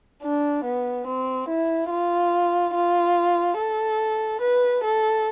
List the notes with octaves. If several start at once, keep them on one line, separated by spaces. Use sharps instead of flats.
D4
B3
C4
E4
F4
F4
A4
B4
A4